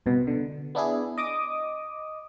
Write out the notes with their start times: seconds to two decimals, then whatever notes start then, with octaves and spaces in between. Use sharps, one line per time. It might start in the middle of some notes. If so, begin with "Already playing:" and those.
0.06 C2 B2
0.27 D3
0.75 B3 D4 E4 G#4
1.18 D#5 D6 D#6